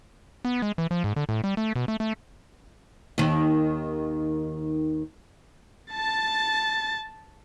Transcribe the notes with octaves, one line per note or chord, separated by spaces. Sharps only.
B3
G#3
E3
F3
G#2
D3
A2
G3
A3
B2
A3
A3
D#2 D#3
A5 A6